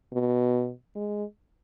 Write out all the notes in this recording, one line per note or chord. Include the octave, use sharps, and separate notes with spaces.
B2
G#3